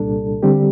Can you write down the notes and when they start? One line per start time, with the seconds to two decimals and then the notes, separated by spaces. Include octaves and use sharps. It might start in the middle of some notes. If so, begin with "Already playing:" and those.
Already playing: C2 A#2 G3 D4 A4
0.43 D3 G3 C4 G4